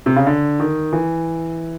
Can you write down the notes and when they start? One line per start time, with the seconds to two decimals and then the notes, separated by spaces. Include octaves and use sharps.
0.06 C3
0.16 C#3
0.27 D3
0.59 D#3
0.93 E3